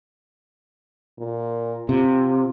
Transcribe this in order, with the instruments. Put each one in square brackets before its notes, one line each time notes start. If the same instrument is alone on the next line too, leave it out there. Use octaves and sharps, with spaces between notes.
[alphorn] A#2
[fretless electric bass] C3 [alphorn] F4